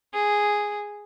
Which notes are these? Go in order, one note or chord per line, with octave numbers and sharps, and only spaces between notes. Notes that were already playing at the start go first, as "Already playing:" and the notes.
G#4